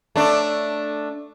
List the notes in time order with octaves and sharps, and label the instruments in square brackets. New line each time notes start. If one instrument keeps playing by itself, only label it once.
[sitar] A3 D4